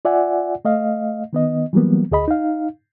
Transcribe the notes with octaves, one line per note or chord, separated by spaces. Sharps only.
F4 D5 E5 F#5 G#5
A3 D#5 F5
D#3 B3 D#5
E3 F#3 G3 A#3 B3
D2 G#4 D#5 B5
D#4 F5